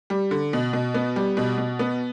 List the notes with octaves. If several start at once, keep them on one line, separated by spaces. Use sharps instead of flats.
G3
D3
B2
B2
B3
G3
B2
B2
B3